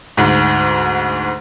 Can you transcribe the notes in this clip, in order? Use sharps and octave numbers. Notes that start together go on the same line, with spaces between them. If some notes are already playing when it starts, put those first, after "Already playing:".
D2 G#2